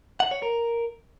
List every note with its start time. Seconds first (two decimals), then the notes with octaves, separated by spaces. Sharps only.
0.20 F#5
0.31 C#5
0.42 A#4